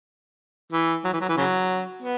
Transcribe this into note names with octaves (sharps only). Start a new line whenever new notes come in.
E3
F#3
E3
F#3
E3
C#3 F#3
B3